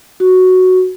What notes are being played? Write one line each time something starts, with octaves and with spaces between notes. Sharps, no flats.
F#4